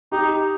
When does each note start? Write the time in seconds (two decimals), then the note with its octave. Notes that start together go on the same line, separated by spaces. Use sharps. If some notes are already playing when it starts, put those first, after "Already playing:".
0.12 D#4 G4